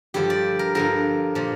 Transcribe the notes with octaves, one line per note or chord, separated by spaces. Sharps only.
G2 D3 F3 G4
D5
A#4
G2 D3 F3 A#4
A#2 F3